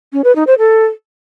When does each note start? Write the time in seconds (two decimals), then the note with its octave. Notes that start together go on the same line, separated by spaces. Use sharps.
0.13 C#4
0.24 B4
0.36 D#4
0.47 C5
0.58 A4